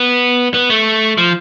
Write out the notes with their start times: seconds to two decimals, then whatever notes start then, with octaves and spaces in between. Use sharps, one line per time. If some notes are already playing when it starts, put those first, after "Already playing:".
Already playing: B3
0.54 B3
0.70 A3
1.18 F3